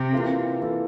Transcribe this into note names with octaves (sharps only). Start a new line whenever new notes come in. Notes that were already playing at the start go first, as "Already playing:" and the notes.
Already playing: C3
E3 A#3 F4 A4
E3 A#3 F4 A4